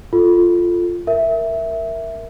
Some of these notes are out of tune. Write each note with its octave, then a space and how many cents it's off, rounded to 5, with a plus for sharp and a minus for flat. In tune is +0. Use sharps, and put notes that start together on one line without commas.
F4 +0 A4 +0
A#4 +0 E5 +0